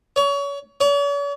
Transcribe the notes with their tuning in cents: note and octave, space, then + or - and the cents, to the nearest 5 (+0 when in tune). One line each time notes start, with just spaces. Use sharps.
C#5 +30
C#5 +45